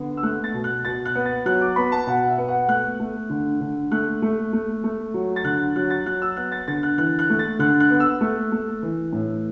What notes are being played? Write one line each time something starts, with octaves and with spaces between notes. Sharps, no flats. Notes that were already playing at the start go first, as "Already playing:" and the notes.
Already playing: D3 B3
E6
A3 F#6
A6
B2
F#6
B2 A6
F#6
B3
A6
F#3 F#6
D6
B3 B5
A5
B2 F#5
E5
B3
F#5
A3 F#6
A3
D3
D3
A3 F#6
A3
A3
A3
F#3
A6
D3 F#6
F#3 F#6
A6
F#3 F#6
E6
B3 F#6
A6
D3 A6
F#6
E3 F#6
F#6
A3
A6
D3 F#6
F#6
B3
E6
A3
A3
E3
A2